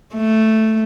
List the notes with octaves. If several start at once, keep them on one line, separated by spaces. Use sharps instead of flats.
A3